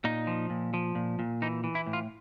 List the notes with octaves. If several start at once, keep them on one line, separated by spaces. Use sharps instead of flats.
A#2 D#4
F3
A#2
F3
A#2
A#2
E3 D#4
E3
E4
A2
F4